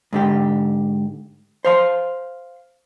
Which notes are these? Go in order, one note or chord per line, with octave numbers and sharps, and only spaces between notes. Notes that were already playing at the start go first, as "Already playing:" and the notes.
G#2 D3 G4
C5 F5 C6